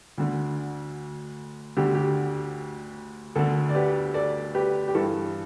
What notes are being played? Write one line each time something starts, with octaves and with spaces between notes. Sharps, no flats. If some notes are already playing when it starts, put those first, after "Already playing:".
D2 D3
D2 D3 G4
G4
D2 D3 A4
D5
G4 B4
A4 D5
G4 B4
G4
G2 E3 A4